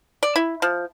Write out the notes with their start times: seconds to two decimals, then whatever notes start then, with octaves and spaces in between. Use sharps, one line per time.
0.23 D5
0.36 E4
0.62 F3